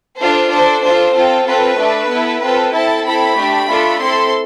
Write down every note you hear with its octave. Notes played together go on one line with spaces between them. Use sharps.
D4 F4 A4 C5
D4 A4 C5
D4 F4 A4 C5
C4 F4 A4
C4 F4 A4 B4
A3 D4 A4
B3 E4 A4
C4 F4 A4 B4
C4 E4 A4 A5
C4 E4 A4 B5
A3 D4 G4
A3 D4 F4 A4
C4 E4 A4 C6